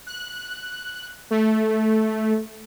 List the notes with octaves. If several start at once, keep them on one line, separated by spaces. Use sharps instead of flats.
F#6
A3